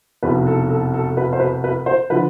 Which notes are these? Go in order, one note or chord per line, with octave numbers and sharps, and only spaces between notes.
F1 E2 B2 B4
A4
A4
A4
B4
C5
B4
B4
C5
D3 F3 B4